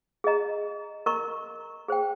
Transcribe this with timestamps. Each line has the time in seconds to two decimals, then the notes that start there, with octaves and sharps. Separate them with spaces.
0.24 G#4 D#5 A#5
1.06 A#4 D#5 A#5 C#6
1.88 G#4 C5 G5